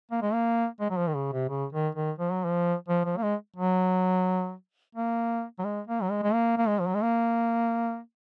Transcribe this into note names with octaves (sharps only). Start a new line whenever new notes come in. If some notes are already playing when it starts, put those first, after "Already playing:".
A#3
G#3
A#3
G#3
F#3
F3
D#3
C#3
C3
C#3
D#3
D#3
F3
F#3
F3
F3
F3
A#3
G#3
F#3
A#3
F#3
G#3
A#3
F#3
G#3
G#3
A#3
A#3
G#3
F3
F#3
G#3
A#3